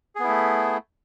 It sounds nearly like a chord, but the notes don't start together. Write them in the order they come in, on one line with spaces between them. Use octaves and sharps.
G#4 B3 E4 A3